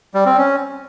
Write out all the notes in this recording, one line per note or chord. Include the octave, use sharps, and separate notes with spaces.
G3
C4
C#4